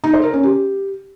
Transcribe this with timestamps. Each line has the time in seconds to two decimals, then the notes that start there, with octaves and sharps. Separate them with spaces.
0.04 D#4
0.14 C5
0.23 A#4
0.33 C#4
0.43 G4